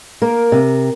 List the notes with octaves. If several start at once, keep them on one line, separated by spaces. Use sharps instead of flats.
A#3 A#4
C3